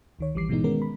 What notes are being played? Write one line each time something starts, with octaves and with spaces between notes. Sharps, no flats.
D2 D#3 C#5
A1 E3 G3 D6 C7
G#2 B2 E3 G#3 B3 D#4
D#3 G#3 B3 C#4 A#4
B5